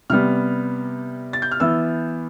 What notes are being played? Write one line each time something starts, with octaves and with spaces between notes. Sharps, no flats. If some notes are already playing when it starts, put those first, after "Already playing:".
C3 G3 B3 F6
A6
G6
F6
E3 B3 E4 E6